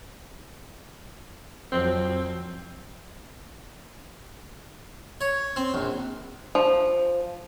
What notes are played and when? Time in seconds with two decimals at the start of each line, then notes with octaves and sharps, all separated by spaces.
1.72 F2 F3 F#3 C4
5.21 C#5
5.56 C4
5.74 A#1
6.55 F3